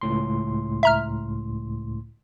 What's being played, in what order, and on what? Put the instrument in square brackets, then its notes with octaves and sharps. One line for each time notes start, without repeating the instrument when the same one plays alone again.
[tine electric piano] C#2 A2 C6
[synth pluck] E5 A#5 F6